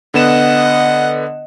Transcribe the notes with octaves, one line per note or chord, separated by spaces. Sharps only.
D3 B3 D#5 F#5 E7